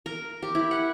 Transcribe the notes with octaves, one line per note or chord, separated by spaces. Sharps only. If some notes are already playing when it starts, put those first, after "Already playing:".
A#4
G4
E4
F#5